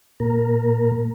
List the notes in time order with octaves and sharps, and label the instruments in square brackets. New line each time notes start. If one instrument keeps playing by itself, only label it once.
[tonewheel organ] A#2 A#4